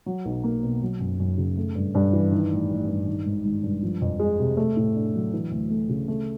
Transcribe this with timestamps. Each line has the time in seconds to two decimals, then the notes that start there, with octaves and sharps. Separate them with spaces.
0.06 F#3
0.25 B1
0.43 A#3
0.63 B2
0.82 F#3
1.00 F#2
1.20 F#2
1.37 C#3
1.57 A3
1.75 G2
1.95 G2
2.13 E3
2.32 D#3
2.51 A1
2.70 A1
2.89 G2
3.07 D#3
3.25 G#1
3.44 G#1
3.63 G2
3.82 F3
4.01 F2
4.19 G#3
4.39 C3
4.57 A3
4.77 A2
4.95 D4
5.15 F#3
5.33 E3
5.51 D2
5.70 A3
5.89 C#3
6.08 A3